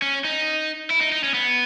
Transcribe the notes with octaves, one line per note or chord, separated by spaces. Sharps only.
C#4
D#4
E4
D#4
D#4
C#4
B3